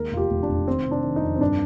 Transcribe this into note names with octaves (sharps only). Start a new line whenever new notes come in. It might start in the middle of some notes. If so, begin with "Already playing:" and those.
Already playing: D#2 G#3 A#4
F1 F4
G4
F1
D4
F1
D#3 C4
C3
D4
D#3
D#4
F2
C4
G2 D4